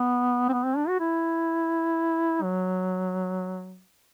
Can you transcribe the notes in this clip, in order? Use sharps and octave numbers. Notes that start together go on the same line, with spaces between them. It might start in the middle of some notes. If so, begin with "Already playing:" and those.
Already playing: B3
C4
B3
C4
D4
F#4
E4
F#3